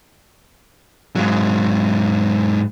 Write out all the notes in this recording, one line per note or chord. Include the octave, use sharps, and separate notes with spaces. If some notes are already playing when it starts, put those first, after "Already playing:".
G#2 F#3